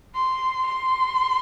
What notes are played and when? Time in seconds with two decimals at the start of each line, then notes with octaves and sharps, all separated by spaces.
0.15 C6
0.67 C6